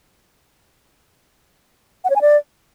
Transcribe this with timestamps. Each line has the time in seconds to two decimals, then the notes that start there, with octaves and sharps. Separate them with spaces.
2.04 F#5
2.10 C#5
2.16 G#5
2.21 D5